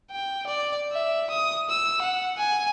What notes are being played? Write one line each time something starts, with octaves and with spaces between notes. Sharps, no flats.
G5
D5
E5
D#6
E6
F#5
G#5